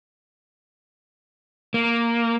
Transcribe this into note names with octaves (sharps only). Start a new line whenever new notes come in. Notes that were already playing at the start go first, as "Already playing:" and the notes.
A#3